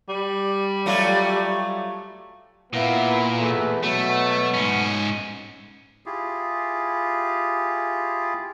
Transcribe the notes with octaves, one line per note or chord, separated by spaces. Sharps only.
G3
F#3 A3 F4
A#2 A#3 B3 E4
E2 E3 A3
B2 F#3 A3
G#2 C#4
E4 F4 G4 G#4